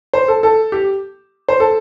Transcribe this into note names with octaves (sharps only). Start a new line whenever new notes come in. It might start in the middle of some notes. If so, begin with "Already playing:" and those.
C5
A4
A4
G4
C5
A4